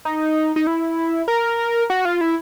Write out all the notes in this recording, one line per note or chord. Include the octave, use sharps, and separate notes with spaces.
D#4
D#4
E4
A#4
F#4
F4
E4